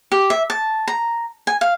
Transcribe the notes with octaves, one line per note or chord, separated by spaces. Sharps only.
G4
E5
A5
A#5
G#5
F5